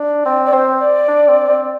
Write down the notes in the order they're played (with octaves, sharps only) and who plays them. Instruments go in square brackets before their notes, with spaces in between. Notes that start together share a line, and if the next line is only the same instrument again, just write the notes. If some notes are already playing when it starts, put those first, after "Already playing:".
Already playing: [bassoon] D4
[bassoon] C4 [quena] D5
[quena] D5
[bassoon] C4 [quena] C5
[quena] D5
[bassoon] D4
C4
C4